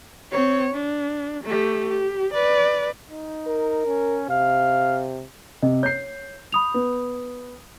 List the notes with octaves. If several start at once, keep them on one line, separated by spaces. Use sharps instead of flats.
C4 C#5
D4
A3 G4
G4
B4 D5
D#4
A#4
C#4
C3 F5
C3 D#5
C#5 G6 C7
B5 D#6 F7
B3